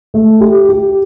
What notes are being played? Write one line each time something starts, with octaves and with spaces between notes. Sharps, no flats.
A3
G4
G4